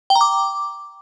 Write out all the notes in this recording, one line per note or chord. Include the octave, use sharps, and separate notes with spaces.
G5
A#5
D6